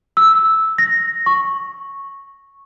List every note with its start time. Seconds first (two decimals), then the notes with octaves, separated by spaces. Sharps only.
0.17 E6
0.78 A#6
1.26 C#6